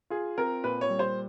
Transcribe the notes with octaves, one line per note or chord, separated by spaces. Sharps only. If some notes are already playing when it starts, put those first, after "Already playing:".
F4 G#4
C4 A#4
A#2 B4
C#5
G3
C5